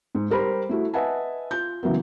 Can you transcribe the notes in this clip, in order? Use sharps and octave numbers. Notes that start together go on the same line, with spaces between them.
G#2
G3 A#4 C5 B5
A3 E4 F#4
B4 D#5 E5 F#5 G#5 A5
F4 G6
C#3 E3 F#3 A#3 B3